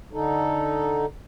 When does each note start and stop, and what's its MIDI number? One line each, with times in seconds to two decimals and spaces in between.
0.13 1.06 50
0.13 1.06 63
0.13 1.06 69